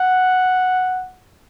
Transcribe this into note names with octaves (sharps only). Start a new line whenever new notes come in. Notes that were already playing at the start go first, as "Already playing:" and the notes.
Already playing: F#5